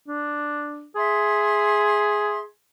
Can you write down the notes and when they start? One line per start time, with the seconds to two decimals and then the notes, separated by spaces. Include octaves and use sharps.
0.08 D4
0.96 G#4 E5 C6